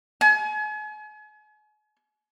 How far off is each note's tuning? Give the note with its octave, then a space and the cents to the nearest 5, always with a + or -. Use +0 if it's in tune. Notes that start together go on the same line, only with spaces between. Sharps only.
G#5 +40